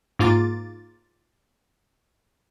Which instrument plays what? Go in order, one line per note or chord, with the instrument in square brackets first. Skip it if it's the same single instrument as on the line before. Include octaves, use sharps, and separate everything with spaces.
[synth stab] G#2 A#3 F4 D6 A6